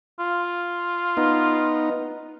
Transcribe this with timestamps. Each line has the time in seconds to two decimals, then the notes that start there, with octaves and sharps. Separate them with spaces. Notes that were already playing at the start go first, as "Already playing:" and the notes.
0.19 F4
1.17 B3 D#4